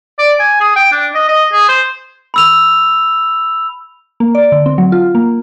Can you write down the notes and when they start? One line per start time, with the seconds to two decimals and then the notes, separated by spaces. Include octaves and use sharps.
0.19 D5
0.40 G#5
0.61 G#4
0.76 G5
0.92 D4
1.15 D#5
1.29 D#5
1.53 G#4
1.68 C5
2.34 B5 E6 F7
4.20 A#3
4.35 D5
4.52 D3
4.66 C4
4.78 F#3
4.92 F4
5.15 A#3